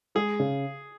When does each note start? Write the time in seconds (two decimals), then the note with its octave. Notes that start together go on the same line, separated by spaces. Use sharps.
0.15 G#3 G#4
0.40 C#3